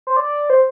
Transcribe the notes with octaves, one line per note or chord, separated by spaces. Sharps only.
C5
D5
C5